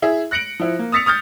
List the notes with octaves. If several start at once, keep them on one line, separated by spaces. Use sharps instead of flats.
E4 G#4 E5
F#6 A#6 C#7 D7 F#7
F3 E4
A#3
D#6 E6 A6 B6 C#7 F7
D#6 F6 G6 A6